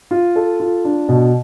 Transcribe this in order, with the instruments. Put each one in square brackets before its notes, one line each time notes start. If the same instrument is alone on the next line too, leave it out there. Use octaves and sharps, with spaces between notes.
[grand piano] F4
A4
F4
D4
B2